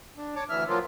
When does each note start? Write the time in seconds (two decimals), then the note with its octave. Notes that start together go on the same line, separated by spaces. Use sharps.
0.17 D4
0.36 C#5 A5 D6
0.49 D2 E3 E5 F6
0.68 F3 F#3 A#3 F4